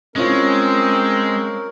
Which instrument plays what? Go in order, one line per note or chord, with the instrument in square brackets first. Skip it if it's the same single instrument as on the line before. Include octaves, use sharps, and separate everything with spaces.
[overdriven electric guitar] G#3 [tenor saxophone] C4 [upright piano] C#4 F4 [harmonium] A#4